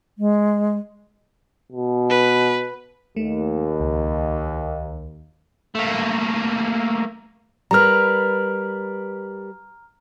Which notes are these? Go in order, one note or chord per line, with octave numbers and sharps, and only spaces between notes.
G#3
B2
B4
D#2 A3
C#2
A3 A#3
G3 A#4 B4 A#5 F6